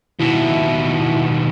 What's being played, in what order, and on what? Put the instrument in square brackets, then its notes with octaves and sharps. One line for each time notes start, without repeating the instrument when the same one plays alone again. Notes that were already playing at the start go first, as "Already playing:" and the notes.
[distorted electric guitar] D#2 B2 [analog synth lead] E4